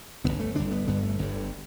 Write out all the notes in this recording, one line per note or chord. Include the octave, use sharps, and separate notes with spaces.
G1 G2 D3 B3
A3
G1 G2 D3 D4
B3
G1 G2 D3 B3
A3
G1 G2 D3